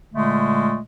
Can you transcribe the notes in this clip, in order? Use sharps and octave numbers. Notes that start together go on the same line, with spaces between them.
A#2 D3 G#3 A3